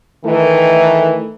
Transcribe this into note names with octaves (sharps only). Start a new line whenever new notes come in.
D#3 E3 A3